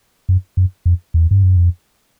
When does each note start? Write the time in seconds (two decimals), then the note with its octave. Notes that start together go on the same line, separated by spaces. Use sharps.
0.29 F#2
0.57 F#2
0.86 F2
1.14 E2
1.31 G2
1.43 F#2
1.57 F2